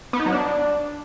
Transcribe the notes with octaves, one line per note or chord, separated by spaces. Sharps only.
B3
D#4
F#3
D4